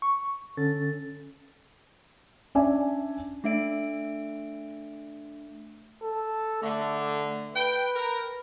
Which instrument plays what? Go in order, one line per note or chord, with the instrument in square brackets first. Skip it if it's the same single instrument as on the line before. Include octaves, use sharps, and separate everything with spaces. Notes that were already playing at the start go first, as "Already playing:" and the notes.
[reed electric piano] C#6
D3 C#4 A4 A6
[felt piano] C#4 D4 D5 E5 G#5
[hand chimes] A3 D4 E5 D7
[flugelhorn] A4
[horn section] D3 [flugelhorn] A3
[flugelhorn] B4 [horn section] G5
[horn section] A#4